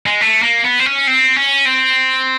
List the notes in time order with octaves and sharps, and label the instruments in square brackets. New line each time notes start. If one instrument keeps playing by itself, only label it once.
[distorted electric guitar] G#3
A3
A#3
B3
C4
C#4
C4
C#4
C4